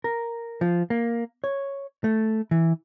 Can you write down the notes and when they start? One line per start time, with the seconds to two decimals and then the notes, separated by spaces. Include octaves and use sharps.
0.04 A#4
0.61 F3
0.90 A#3
1.44 C#5
2.04 A3
2.51 E3